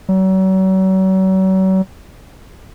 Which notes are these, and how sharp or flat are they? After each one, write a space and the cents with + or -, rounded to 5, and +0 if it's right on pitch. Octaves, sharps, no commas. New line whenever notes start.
F#3 +40